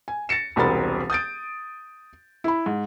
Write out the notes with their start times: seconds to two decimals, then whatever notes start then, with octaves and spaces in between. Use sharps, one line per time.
0.08 G#5
0.29 A6 A#6 C#7 E7
0.56 E1 C2 C4 A#4 B5 A6
1.10 D#6 G6 A6 D7
2.44 E4 B5
2.66 G#2